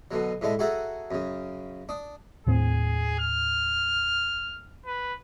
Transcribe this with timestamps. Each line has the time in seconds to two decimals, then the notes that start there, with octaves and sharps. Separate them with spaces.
0.11 B2 D3 F#3
0.41 A2 D3 G#3 A3 A4
0.59 F#4 G#4 A4 E5 F#5 A#5
1.11 F#2 C#3
1.89 D4 D#6
2.47 D#2 A2 C4 G#4
3.19 F6
4.86 B4